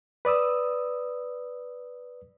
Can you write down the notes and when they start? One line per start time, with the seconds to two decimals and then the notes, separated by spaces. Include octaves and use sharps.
0.25 B4 D5 D#6 E6